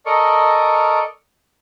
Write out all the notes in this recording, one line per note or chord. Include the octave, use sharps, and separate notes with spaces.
A4 A#4 D5 D#5 C#6